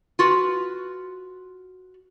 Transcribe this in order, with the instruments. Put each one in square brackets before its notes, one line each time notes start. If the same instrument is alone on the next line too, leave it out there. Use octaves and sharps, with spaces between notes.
[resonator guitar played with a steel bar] F4 F#4 B4